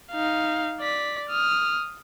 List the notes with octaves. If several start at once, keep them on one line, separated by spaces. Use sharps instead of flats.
D#4 F5
D5 B6
D#6 F6